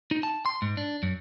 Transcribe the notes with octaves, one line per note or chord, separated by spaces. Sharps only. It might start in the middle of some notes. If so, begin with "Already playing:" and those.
D#4
A5
C6
G#2
D4
F#2